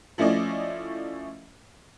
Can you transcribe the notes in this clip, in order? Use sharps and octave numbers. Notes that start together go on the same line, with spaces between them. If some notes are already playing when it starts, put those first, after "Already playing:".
F3 A3 C#4 E4 D5 D#5